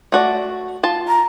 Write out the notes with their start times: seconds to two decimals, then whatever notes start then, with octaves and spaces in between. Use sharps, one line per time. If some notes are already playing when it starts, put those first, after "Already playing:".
0.12 A3 F#4 D5
0.83 F4 A5
1.08 A#5